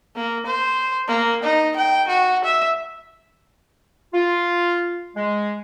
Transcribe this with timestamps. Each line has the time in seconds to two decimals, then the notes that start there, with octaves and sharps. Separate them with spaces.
0.16 A#3
0.46 C5
1.08 A#3
1.43 D#4
1.76 G5
2.08 F#4
2.45 E5
4.14 F4
5.17 G#3